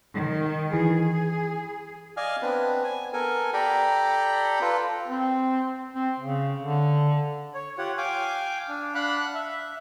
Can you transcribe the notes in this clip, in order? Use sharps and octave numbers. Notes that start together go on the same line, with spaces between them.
D#3
E3 G#4
D5 D#5 F5 G#5 F6
B3 C4 D4 B4
G#5
B3 A4 A#4 G#5
G4 A4 D5 G5 A#5 B5
F4 A4 B4
C4
C4
C#3
D3
C#5
F4 G4 C#5 F#5
F5 G5 G#5 D6
D4
D4 F5 F#5 B5 F#6
E5